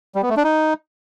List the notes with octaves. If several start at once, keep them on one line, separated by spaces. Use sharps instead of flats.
G3
B3
A3
D4
D#4